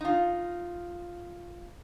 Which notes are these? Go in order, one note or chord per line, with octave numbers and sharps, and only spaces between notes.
D#4 F4